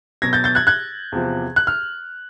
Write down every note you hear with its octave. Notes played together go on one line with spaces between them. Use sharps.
B2 F#3 G#6 A#6
G6 A6
G6 A6
F#6 G#6
F#6 G#6
E2 C3 F3
F#6
F6